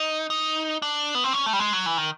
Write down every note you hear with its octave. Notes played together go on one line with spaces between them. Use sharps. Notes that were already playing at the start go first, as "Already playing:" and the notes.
Already playing: D#4
D#4
D4
B3
C4
C#4
A3
G3
G#3
F#3
E3
D#3